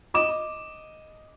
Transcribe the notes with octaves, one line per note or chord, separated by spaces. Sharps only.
D#5 D6 E7